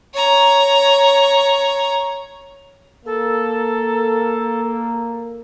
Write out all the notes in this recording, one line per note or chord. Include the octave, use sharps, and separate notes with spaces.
C#5 A#5
A#3 A4